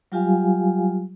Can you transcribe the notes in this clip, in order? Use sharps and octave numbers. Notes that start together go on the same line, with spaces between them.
F#3 G3 F4 G4 F5 G#5